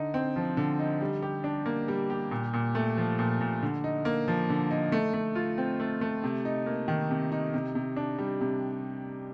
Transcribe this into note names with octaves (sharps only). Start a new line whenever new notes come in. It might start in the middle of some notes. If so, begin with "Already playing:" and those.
Already playing: D3 D#4
C4
F3
D3
D#4
G3
G4
D4
A#3
G3
G4
A#2
A#2
A3
F3
A#2
A#2
D3
D#4
A#3
F3
D3
D#4
A3
A3
F4
C4
A3
A3
C3
D#4
A#3
D#3
C3
D#4
C3
C3
D4
G3
C3